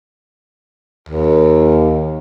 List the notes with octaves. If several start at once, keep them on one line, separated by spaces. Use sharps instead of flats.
D#2